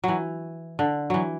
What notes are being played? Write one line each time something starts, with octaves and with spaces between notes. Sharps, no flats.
E3 F#3
D3
E3 F#3